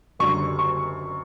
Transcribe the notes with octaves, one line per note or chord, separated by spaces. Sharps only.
F#1 F#2 D3 G3 C#6
C#6